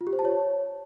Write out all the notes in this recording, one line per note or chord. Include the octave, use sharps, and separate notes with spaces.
F4
G4
C5
A5
C#5